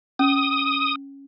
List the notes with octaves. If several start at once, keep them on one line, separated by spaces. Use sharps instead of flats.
C#4 D#6